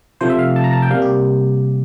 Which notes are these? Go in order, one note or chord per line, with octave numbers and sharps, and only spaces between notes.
C3 F3 A3 C5
E5
F5
A5
A#5
A5
G5
C3 G3 A#3 F5
G4